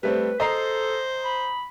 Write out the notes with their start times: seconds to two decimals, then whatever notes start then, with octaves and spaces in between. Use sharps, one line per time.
0.03 G3 A3 C4 B4
0.40 A4 C5 D#5 A#5 C7
1.23 B5